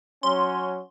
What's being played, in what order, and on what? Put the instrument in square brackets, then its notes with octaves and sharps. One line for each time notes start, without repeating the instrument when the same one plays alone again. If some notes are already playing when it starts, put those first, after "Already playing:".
[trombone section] F#3 C#4 [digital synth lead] C6